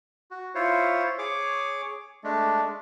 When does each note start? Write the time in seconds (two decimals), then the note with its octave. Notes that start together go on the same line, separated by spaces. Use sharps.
0.31 F#4
0.55 E4 F4 C5 C#5
1.18 G#4 C#5 D6
2.24 G#3 A3 D4